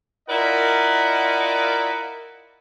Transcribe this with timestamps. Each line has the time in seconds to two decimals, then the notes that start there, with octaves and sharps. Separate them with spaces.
0.29 E4 F4 A#4 D5 D#5 F#5